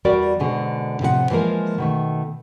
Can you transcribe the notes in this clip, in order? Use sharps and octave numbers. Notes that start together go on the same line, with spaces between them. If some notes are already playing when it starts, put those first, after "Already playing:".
E2 G3 F#4 A#4 D5
G#2 B2 D3 G#4
A2 C3 F3 G#4 F#5
E3 F3 G#3 A#3 A#4
B2 D#3 A3